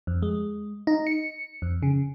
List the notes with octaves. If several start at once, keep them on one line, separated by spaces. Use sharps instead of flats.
F2
G#3
D#4
C#7
F2
C#3